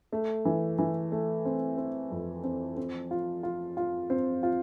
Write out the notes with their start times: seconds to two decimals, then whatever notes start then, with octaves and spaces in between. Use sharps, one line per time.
0.12 A3
0.45 E3
0.78 E3
1.12 A3
1.45 C4
1.77 C4
2.11 F2
2.44 C4
2.77 C4
3.11 F4
3.43 F4
3.77 F4
4.10 C4
4.43 F4